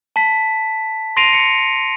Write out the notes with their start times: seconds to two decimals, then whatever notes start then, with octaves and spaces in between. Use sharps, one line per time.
0.16 A5 B6
1.17 C6 A#6 C7 D7 D#7 F7
1.33 C#7